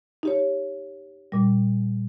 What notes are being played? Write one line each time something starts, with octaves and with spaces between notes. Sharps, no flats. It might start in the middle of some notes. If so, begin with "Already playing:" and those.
D#4 G4 C#5
A#2 G3